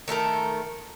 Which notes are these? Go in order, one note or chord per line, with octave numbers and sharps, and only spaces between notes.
D#3 A3 A4 A#4